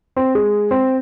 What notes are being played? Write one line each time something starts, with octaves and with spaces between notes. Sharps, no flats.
C4
G#3
C4